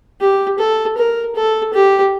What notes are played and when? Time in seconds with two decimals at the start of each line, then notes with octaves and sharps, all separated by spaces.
0.21 G4
0.59 A4
0.98 A#4
1.36 A4
1.74 G4